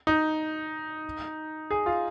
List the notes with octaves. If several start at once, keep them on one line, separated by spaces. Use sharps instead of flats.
D#4
G#4
F4